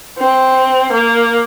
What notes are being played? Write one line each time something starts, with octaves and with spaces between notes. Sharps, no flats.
C4
A#3